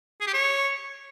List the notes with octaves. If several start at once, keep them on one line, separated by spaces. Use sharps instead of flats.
G#4
G4
C#5